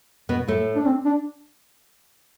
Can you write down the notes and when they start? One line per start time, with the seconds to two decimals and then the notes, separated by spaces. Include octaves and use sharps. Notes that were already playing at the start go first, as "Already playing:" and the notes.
0.29 B2 B3
0.47 A2 A3
0.76 D4
0.86 C4
1.05 D4